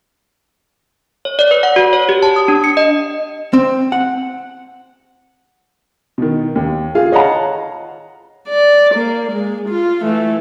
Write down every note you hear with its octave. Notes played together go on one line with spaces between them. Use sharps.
C#5
D5
B4
F#5
F#4
C#5
G4
A5
D#6
D4
C#7
D#5
C4
F#5
B2 D#3
D#2
F4 G#4 F5
C#5 D#5 F5 F#5 A5 A#5
D5
A#3
G#3
F4
E3 A3